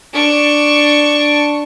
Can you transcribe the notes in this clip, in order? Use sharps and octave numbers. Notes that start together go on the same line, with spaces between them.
D4 C#6